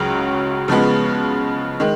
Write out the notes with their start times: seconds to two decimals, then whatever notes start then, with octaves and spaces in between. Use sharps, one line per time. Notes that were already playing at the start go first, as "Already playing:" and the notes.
Already playing: C#2 C#3 F#3
0.68 C#3 F3 G#3 B3
1.80 D#3 G#3